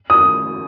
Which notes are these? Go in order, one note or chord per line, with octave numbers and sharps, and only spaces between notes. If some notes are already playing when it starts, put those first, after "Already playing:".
D#6